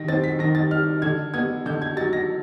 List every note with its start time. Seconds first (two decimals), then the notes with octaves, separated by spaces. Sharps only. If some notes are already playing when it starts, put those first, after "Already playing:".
Already playing: D#3 A#6
0.08 C4 A6
0.24 B6
0.39 D#3 A#6
0.55 A6
0.71 G3 F6
1.02 D3 G#6
1.34 B3 G#6
1.66 D3 G6
1.82 G#6
1.97 F#3 A6
2.13 A#6